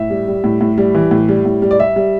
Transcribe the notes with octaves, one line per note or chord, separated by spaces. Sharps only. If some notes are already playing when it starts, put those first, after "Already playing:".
Already playing: A2 E5
G3
G3
A2
A2
G3
E3
A2
G3
A2
G3
D5
G3 E5
G3